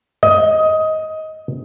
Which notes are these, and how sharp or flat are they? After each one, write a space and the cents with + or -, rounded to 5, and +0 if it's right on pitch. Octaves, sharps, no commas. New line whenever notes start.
D#5 +15